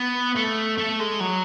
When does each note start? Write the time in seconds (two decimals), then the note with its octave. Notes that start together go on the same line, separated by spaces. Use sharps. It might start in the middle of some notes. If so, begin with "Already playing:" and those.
Already playing: B3
0.35 A3
0.78 A3
0.99 G#3
1.20 F#3